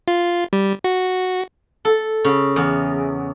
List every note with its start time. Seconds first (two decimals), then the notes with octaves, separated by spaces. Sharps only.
0.08 F4
0.53 G3
0.84 F#4
1.85 A4
2.25 C#3
2.56 E2